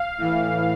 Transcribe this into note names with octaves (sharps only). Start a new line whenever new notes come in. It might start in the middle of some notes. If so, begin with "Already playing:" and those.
Already playing: F5
A2 E3